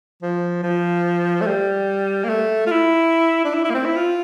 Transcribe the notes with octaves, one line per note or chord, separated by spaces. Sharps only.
F3
F3
A3
G3
A#3
A3
F4
E4
D4
E4
E4
A#3
C4
E4
F4